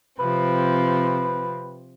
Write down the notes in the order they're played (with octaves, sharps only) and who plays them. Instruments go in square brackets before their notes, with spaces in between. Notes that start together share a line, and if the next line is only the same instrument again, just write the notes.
[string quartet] C3 F3 C4 [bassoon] B4